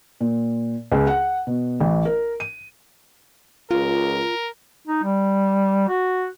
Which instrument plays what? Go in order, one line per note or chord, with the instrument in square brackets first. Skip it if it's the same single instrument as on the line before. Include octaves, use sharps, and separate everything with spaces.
[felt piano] A#2
C#2
F#5
B2
A1
A#4
D#7
[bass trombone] C#2 [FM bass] F4 [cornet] A#4
[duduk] D#4
G3
F#4